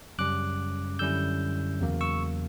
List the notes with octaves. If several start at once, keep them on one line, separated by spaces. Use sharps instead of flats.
F#2 C#3 G3 C#4 D6 F#6
F#2 D3 G3 C#4 E4 E6 G6
E2 C#3 F#3 A#3
C#6 E6